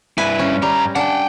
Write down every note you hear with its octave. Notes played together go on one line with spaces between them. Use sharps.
G2 E4 B4 G#5
C#4
G2 G3 A#5
D4 F#5 G5